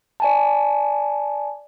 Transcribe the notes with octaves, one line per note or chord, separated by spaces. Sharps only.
D5 G#5 A5